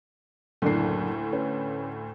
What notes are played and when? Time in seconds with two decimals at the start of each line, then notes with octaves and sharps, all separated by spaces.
0.62 F#1 D2 A2 D4 C7
1.32 C#4 B4